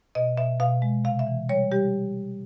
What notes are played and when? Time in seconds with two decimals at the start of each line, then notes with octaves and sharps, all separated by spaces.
0.15 B2 D#5
0.38 B2 E5
0.60 B2 F5
0.82 G#3
1.05 C3 F5
1.19 E5
1.27 E3
1.49 G3 C#5
1.72 G3 G4